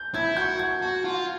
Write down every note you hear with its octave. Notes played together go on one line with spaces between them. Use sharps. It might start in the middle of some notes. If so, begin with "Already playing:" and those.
Already playing: G6
E4 G#6
F#4 G6
G#6
F#4
F4